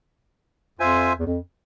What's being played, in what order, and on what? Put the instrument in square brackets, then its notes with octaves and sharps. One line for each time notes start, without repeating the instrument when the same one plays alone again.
[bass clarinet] F2 [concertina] F4 C5 E5 G#5
[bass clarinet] E2
F2